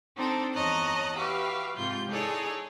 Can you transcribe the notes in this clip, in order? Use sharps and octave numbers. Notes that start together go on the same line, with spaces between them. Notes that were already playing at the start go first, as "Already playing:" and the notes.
C4 D4 D#4 A4 C5
E2 C#5 D#5 A5 A#5 F#6
F#4 G4 B4 E5 F5
G#2 C3 F4 G6
D#4 E4 G#4 A4 C#5 D5